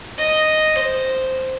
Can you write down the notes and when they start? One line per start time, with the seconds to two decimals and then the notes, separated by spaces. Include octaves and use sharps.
0.18 D#5
0.76 C5